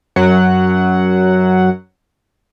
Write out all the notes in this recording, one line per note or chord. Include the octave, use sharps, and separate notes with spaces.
F#2 F#3 F#5